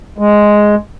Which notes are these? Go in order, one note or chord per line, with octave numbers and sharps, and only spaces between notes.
G#3